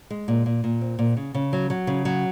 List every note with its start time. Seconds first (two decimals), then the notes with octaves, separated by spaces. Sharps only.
0.10 G#3
0.28 A#2
0.46 A#2
0.64 A#2
0.81 C4
0.99 A#2
1.17 C#3
1.34 C#3
1.53 F#3
1.70 F#3
1.87 C#3
2.05 F#3